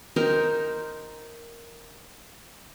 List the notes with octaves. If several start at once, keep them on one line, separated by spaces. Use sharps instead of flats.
D#4 A#4 C5 G5